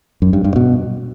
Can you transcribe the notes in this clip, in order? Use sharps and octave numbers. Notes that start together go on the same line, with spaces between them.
F#2
G2
G2
B2